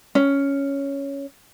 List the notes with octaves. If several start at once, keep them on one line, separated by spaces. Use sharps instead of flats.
C#4